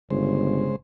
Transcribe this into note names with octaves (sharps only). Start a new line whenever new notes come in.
G1 C#3 G#3 C5